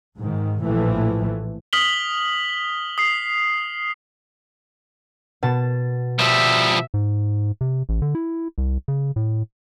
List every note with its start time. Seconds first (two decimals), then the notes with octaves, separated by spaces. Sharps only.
0.19 G#2 D#3
0.61 A#1 A2 E3 F3 A3
1.73 D#6 F6 B6 F#7 G7
2.98 D#6 C7
5.43 B2 A5
6.19 F3 G3 E5
6.94 G#2
7.61 C3
7.89 A1
8.02 D3
8.15 E4
8.58 C2
8.88 C#3
9.16 A2